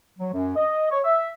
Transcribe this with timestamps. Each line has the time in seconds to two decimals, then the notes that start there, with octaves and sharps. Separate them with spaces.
0.19 F#3
0.33 F#2
0.57 D#5
0.91 C#5
1.04 E5